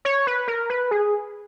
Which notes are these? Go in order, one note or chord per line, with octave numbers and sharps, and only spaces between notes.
C#5
B4
A#4
B4
G#4